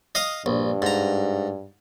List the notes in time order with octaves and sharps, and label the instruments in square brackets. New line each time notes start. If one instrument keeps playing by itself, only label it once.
[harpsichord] D#5 F5 D#6
[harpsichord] A#1 [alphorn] G2
[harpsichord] G#2 A#5